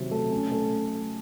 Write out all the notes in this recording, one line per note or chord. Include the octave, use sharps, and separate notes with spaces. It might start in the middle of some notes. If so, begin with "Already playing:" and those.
Already playing: C3 D#3 F#3
A3
C#4
A3